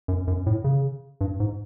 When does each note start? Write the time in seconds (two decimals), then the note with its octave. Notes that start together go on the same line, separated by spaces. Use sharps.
0.08 F#2
0.27 F#2
0.46 A2
0.64 C#3
1.21 G2
1.40 G#2